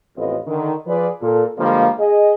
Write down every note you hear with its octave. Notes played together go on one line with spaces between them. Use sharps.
A1 F2 B3 C4 F4 D#5
D3 D#3
F3 F4 G#4 B4 D5
A#2 A4
D3 F3 G3 G#3 A#3
G#4 D#5